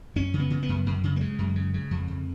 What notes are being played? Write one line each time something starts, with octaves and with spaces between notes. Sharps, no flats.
F#2 C#4
C#3
B3
C#3
B3
F#2
F#2
C#3
A#3
C#3 G#3
F#2
C#3
C#3
F2
F2